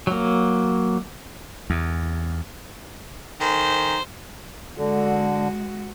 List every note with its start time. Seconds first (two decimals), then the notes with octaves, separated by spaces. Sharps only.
0.07 F#3 A#3
1.70 E2
3.40 D#3 A4 C5 G#5 A#5
4.78 D3 G#3 F#4